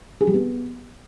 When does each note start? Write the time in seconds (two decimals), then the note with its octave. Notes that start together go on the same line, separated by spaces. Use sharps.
0.21 G#4
0.27 G3
0.34 B3